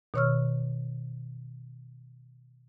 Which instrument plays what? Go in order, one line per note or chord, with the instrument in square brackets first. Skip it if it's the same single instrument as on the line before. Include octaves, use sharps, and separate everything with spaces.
[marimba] B2 D#3 C#5 C#6 E6 F6